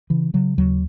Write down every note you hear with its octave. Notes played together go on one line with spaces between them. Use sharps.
C#3 E3
C#3 F#3
D#2 F#3